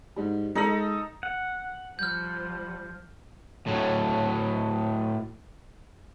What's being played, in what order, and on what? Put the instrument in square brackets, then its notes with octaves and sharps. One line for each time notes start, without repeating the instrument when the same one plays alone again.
[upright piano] G#2 G3
[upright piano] G#3 F#7 [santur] D#4 A4 D#5
[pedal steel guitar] F#5
[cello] F3 [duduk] G3 [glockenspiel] F6 G6
[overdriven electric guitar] A2 F#3